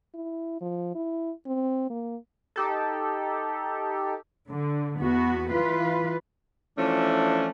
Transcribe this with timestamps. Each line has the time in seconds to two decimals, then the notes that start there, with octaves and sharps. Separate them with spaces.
0.14 E4
0.61 F3
0.95 E4
1.47 C4
1.90 A#3
2.56 D#4 G4 A4
4.49 D3
4.98 E2 B3 F#4
5.50 E3 F4 B4
6.77 E3 F3 A3 C#4 D4